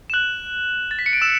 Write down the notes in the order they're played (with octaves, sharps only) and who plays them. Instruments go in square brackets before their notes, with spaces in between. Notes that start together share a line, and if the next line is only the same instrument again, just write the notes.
[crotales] E7
F#6 F#7
A6
B6
C#7
D7
E6 E7